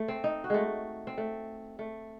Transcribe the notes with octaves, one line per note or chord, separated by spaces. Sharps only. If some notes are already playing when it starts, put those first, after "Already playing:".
Already playing: A3
C4
D#4
F#4
G#3 A3
C4
A3
A3